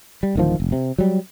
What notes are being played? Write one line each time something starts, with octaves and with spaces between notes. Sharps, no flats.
G3
D1 D#3 F3
F1
C3
F#3 G3